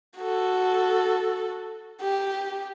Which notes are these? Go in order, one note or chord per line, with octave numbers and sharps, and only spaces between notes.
F#4 A4
G4